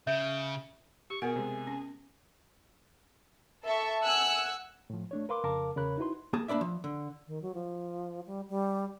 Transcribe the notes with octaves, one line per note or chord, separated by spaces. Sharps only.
C#3 E5 G6
G4 C#6
B2 B3 G#4 A#4 F#5
C3 G#3
C#4
A4 E5 A5 C#6
F#5 G#5 E6 F#6
A2 F3
A3 D4 C#5
A#4 B4 F5 C6 D6
F2 C#3 A#4 F5 A5 D6
E2 C#3 A#4 C#5 B5 F#6
D#4 E4 F#4 B4 C6
A#3 G#4 A5
A#3 D4 B4 D5 E5
F3
D3
D#3
F#3
F3
G3
G3